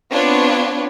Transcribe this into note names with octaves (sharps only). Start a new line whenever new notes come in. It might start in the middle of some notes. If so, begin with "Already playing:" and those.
B3 C4 D4 F4 B4 C#5